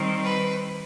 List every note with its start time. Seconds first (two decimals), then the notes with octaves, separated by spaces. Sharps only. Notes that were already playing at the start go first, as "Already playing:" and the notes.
Already playing: D#3 G3 C4
0.24 B4